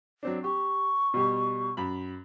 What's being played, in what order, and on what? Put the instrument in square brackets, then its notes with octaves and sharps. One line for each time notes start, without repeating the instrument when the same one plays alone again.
[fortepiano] F#3 C4 D4
[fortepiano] G4 [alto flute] C#6
[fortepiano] B2 G3 G4
F#2 B5